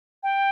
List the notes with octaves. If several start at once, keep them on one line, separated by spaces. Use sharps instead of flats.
G5